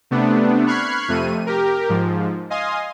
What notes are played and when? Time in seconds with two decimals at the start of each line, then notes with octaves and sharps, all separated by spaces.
0.11 C3 A3 B3 D4
0.67 B5 C#6 F6 F#6 G#6 C7
1.08 F2 C3 A3 D#7
1.47 G4 A#4
1.89 G#2 F3
2.50 D#5 F5 G#5 C6 D#6